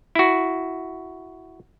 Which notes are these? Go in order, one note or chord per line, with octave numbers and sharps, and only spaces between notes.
E4 F#4